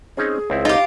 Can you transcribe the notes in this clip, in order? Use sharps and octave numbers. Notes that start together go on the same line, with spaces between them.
C4 C#4 D#4 G#4
C#2 C4 E4
D#4 F4 G4